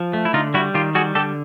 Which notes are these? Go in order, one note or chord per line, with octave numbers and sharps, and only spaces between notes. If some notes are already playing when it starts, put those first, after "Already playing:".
Already playing: F3
A3
E4
D3 D#4 F4
G3 E4 F#4
D#3 F4 G4
G3 F#4 G#4
D3 G4 A4